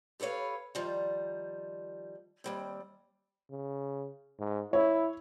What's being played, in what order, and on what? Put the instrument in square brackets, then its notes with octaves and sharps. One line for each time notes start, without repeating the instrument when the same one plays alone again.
[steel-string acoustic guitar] G4 A4 B4 C#5 F5
D#3 F3 G3
D#2 G3 C4
[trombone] C#3
G#2
[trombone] E4 [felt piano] C#5